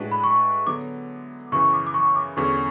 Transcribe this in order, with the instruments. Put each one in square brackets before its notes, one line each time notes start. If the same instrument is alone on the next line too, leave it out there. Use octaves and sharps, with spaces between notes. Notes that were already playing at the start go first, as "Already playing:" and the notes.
Already playing: [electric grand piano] A2 G#3 D4 F#4 B4
[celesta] B5
C#6
[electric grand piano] D3 F#3 B3 [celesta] D6
[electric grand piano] F#2 C#3 E3 [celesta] C#6
[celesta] D6
D6
C#6
D6
[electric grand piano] E2 D3 F#3 C#4 G#4 [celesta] C#6